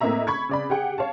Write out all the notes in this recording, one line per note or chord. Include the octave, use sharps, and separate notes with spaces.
A2 A#3 C4 D#5 E5 A#5
B5 C#6 G#6
C#3 D5 B5
G4 G#4 F#5 G5
C#5 F5 A5